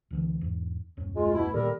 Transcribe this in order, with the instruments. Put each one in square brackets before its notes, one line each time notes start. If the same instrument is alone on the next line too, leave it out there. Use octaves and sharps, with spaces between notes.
[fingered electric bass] C#2 D3 E3
E2 G#2
D#1 F#2 C#4
[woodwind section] G#3 F4
B2 A3 E4
[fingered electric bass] A#2 D#3 B3 [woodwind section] G3 A4 A#4